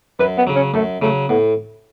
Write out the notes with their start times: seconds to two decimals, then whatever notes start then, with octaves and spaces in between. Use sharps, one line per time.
0.20 F#2 B4
0.38 B3
0.47 C#3 F#3
0.56 C#4
0.74 F#2 A3
1.02 C#3 F#3 A3
1.29 A2 B3